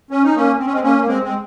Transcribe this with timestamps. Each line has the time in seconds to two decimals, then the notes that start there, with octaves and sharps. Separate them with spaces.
0.11 C#4
0.23 D#4
0.35 A#3 C#4
0.59 C4
0.66 C#4
0.73 G#3 C4
0.83 A#3 C#4
0.98 A#3
1.07 G#3 C4
1.23 G#3 C4